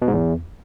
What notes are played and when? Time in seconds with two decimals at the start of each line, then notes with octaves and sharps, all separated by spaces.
0.02 B2
0.08 G#2
0.14 E2